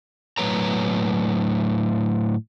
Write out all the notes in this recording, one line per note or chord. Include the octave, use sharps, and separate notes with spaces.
A2 F#3 C#4 B4 C#5 A#5